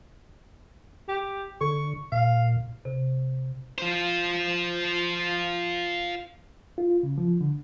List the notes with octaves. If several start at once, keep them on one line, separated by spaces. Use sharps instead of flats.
G4
D3 C#6
A#2 F5
C3
F4 C5
F4
C#3
F3
D3